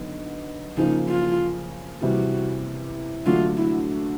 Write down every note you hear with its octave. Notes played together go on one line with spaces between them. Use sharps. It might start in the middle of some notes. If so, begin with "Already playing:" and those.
Already playing: D3 F#3 B3 D#4
C#3 F3 A#3 D#4
F4
C3 E3 G3 F#4
D3 F#3 A3 D4 F4 F#4
E4